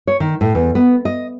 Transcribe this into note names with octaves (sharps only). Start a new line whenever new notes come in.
C#5
D#3
A2
E2
B3
D#5